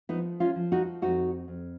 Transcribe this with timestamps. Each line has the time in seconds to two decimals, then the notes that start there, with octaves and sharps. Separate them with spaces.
0.09 F3 B3 D#4
0.40 C#4 F4
0.56 F3
0.72 D#4 F#4
1.02 F2 D#4 F#4
1.48 F2